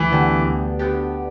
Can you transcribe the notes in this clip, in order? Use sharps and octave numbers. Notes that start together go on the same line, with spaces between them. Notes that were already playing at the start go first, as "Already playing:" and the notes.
Already playing: D2 E3
D3 B3 D4 G4
D2
D3 B3 D4 G4